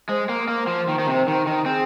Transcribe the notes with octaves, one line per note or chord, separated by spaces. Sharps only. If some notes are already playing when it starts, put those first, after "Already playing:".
G#3 C5
A#3
A#3
F3
D#3
D#3
C3
D#3
D#3
C4 G#4